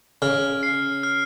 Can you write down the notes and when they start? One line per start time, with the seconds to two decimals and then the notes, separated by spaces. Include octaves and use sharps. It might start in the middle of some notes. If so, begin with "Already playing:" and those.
0.22 C#3 F6
0.63 C7
1.03 F6